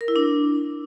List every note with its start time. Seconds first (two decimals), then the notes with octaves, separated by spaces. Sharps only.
0.01 A#4
0.08 E4
0.16 D4